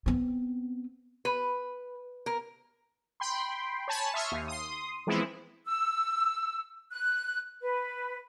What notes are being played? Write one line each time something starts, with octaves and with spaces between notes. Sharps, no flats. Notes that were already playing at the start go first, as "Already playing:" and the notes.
B3 C4
B4
A#4
G5 B5 C6
C#5 G#5 A5 B5
E5 C6 C#6 D#6 F6
D#2
C6 D#6
E3 F3 G#3 B3 C4 E4
E6
F#6
B4